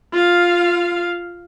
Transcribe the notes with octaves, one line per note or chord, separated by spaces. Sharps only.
F4 F5